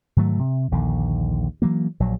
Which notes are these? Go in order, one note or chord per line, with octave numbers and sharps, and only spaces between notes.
G#2 D#3 F#3 A3
C3
A#1 D#2 D3
E3 F#3 A#3
A#1 F#3